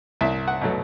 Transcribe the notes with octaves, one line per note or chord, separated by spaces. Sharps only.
C2 E5
F#5
B2 F#3 A3